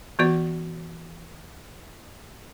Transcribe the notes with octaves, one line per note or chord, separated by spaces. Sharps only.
E3 B3 F#4 D5